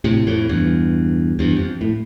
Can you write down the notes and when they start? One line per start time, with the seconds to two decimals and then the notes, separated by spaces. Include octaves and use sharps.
0.04 A2 C3
0.27 F2 A2
0.49 E2 G2
1.39 E2 G2
1.56 F2
1.81 A2